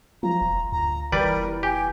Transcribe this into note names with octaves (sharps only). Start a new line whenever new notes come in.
F3 F4 A#5
E1
D2 A#5
F1 E3 G3 A#4 B4 D5
G4 G#5